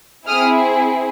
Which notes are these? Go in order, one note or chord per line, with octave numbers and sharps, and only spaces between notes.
C4 E4 G#4 D#6 F6